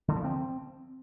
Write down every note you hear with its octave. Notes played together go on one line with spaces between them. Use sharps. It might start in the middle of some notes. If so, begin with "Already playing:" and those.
D3
F3
C4